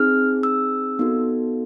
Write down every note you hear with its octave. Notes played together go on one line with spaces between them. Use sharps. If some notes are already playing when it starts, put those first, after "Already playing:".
Already playing: C4 D#4 G#4 F6
E6
B3 D#4 F#4 A4